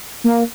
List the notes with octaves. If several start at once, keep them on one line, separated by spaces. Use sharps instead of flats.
A#3